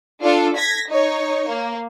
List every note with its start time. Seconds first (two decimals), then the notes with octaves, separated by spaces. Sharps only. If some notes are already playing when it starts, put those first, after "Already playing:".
0.22 D4 F4 A4
0.56 G#6 A#6 B6
0.89 D#4 C#5
1.48 A#3